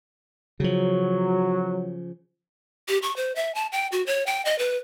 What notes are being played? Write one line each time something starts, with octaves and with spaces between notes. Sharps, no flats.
C#3 F3 F#3
G4
C#6
C5
E5
A5
G5
F#4
C#5
G5
D#5
B4